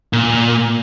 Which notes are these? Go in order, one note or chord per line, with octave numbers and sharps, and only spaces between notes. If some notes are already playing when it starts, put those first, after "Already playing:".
A#2